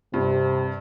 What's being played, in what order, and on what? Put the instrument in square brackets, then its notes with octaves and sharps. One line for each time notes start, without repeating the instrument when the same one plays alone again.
[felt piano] G2 [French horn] C3